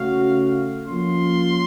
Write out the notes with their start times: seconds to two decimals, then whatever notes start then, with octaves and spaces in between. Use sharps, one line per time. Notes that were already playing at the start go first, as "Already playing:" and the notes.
Already playing: C#3 A3 C#4 F#4 F5
0.87 F3 A#3 C#4 F4 C6